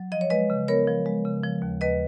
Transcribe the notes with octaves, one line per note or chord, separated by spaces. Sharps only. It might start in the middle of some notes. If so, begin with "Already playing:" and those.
Already playing: F#3
F3 D#5
C#5
G#3 B4 D#5
C#3
B3 A#4 C#5
F3
G#3
C#3
F3
D#2
D#2 B4 D#5